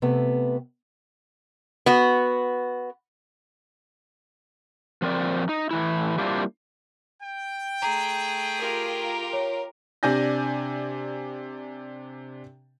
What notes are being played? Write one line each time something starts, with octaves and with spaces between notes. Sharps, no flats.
C3 A3 B3
B3 F#4
F3 C4 A#4 D5
D#4
A2 E3 E4
G3 A#3 C4 D4 E4 F4
G5
A3 G#4 A#5
F4 G4 A#4
C#5
C3 D4 D5 G#5 G6 A#6